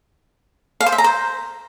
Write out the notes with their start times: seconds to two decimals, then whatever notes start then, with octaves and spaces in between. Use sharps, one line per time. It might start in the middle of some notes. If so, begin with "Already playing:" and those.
0.81 F5
0.86 C5
0.92 E5
0.98 A#5
1.04 C5